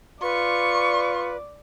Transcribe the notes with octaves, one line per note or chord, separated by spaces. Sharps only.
F4 B4 D5 C#6